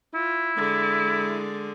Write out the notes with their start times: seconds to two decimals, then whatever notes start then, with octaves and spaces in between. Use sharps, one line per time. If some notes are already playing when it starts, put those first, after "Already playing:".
0.14 E4 F4
0.56 D3 G#3